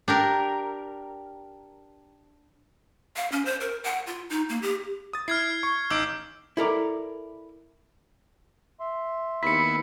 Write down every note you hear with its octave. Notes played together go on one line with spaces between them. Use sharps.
D4 G4 A#4
F5
C#4
C5
A#4
F#5
F4
D#4
A#3
G4
D#6 A6
E4 F6 G#6 C7
C#6
A1 D#4 D6 E6 G6 D7
E4 A4 A#4 D5
E5 C6
D#2 B3 E4 B6 C#7